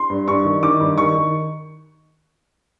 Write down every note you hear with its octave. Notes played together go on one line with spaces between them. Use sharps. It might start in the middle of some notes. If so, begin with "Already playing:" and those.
Already playing: C6
G2
G2 C#6
D#3
D#3 D6
G2
D#3 C#6
D#3